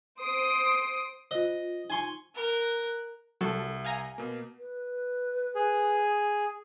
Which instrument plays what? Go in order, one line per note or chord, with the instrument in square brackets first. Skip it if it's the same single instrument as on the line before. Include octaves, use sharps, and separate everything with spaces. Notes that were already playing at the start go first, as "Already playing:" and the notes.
[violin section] C5 D#6 C7 D7
[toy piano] F4 C5 [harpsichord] D#5
[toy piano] D#4 [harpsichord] G#5 C6 C#6
[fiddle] A#4 F#6
[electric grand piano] C2 [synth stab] F#3 A4
[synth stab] F5 G#5 A#5
[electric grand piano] B2 A#3
[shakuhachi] B4
[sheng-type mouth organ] G#4